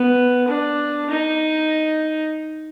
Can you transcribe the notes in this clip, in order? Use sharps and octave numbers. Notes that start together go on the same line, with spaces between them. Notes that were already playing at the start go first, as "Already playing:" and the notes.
Already playing: B3
D4
D#4